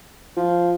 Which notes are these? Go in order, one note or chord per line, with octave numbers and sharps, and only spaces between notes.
F3